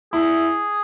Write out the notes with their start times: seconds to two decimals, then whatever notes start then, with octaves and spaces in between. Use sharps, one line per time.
0.13 E4 G#4